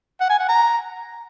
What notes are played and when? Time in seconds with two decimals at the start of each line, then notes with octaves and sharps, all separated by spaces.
0.20 F#5
0.30 G#5
0.39 F#5
0.49 A#5